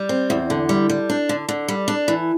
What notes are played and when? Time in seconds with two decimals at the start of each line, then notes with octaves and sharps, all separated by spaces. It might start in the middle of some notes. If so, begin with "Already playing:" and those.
Already playing: G3
0.09 C4
0.30 E2
0.50 D3
0.69 G3
0.89 G3
1.10 D4
1.29 D3
1.49 D3
1.68 G3
1.88 D4
2.08 E3